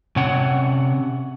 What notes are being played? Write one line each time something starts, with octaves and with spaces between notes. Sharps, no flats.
C3 C#4 F#5